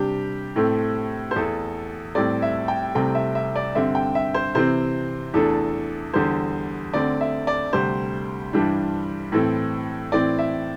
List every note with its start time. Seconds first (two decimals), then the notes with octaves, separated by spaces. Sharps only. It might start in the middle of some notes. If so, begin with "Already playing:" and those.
Already playing: C3 G3 D4 G4
0.56 A2 A3 C4
1.31 C5
1.36 E2 E3 A3 A4
2.15 A2 G3 C4 D5
2.42 E5
2.68 G5
2.95 C2 C3 A3 C4 G5
3.15 E5
3.35 E5
3.56 D5
3.75 G2 D3 C4 E5
3.95 G5
4.15 E5
4.34 C5
4.55 C3 E3 C4 C5
5.34 E2 E3 A3 D4 A4
6.14 E2 D3 G3 C5
6.94 D2 D3 C4 D5
7.21 E5
7.47 D5
7.73 D2 C3 G3 C5
8.53 G2 E3 G3 D4
9.32 A2 E3 C4 A4
10.12 A2 E3 C4 D5
10.38 E5